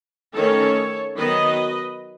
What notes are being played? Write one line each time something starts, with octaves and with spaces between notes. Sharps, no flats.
D#3 A3 C#4 A4 C#5
D#3 F#3 B3 B4 D#5